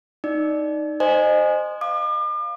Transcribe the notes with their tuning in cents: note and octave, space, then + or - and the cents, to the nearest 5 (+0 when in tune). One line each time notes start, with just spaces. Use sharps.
D#4 +0 D5 +0
C5 +0 D#5 -25 G#5 +0
F5 +0 D6 +40